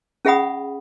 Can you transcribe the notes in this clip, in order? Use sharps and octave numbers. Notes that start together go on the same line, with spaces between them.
C#4 G#4 E5 F#5 B5 D#6